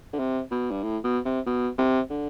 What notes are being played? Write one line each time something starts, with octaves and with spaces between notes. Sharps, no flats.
D3
C3
B2
G2
A2
B2
C3
B2
C3
D3